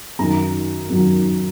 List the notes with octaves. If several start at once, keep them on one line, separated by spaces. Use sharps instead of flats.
F#2 D#3 F#3 A#5
F#2 D#3 F#3